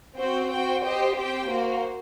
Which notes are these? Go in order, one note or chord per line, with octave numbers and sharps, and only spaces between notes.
C4 F#4 C5 G5
F#4 C5 G5
G4 C5 D#5 G5
C4 G4 C5 G5
A#3 F#4 C5